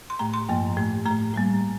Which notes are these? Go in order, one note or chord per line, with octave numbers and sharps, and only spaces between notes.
C6
A2 A3 A#5
C6
G2 F3 A#3
A2 A3
A3 A#5
A2
A2 G3 A#3